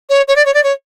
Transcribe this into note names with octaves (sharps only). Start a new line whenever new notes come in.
C#5
C#5
D5
C#5
D5
C#5